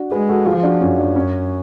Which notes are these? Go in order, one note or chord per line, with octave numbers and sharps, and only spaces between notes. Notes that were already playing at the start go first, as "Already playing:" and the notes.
Already playing: D4 F#4
G#3 G#4 B4
F#4 A4
F3 F4 G#4
D4 F#4
F#2 C#4 F4
D4
C#4